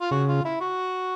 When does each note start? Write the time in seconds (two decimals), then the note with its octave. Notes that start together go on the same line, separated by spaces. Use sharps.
0.02 F4
0.11 C#3 F#4
0.29 F4
0.45 E4
0.61 F#4